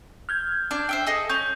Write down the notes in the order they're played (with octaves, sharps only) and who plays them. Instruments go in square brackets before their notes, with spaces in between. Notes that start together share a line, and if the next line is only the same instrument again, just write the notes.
[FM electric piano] F6 G6 G#6
[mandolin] D4 D5
C5 E5 G5
G#4 A4 D#5
[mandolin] C#4 [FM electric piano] G6